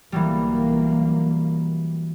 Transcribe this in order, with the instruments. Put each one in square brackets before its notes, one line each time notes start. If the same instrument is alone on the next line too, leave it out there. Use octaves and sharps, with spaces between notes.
[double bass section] B1 A#3 [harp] E3 F#3 G3